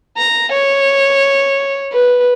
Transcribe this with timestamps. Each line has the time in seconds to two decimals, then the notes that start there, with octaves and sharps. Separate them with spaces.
0.18 A#5
0.52 C#5
1.93 B4